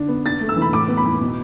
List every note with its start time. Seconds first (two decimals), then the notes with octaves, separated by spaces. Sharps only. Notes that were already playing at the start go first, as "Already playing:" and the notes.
Already playing: D3 D4
0.08 B3
0.26 D4 A6
0.41 A3
0.49 E6
0.56 E3
0.62 B5
0.73 A2 D6
0.88 B3
0.97 B5
1.05 E3
1.21 B2